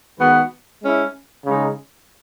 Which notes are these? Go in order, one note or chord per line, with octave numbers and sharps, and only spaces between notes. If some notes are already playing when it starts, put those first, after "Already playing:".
D#3 G#3 B3 F#4 B4
G#3 C#4 E4
C#3 G#3 D#4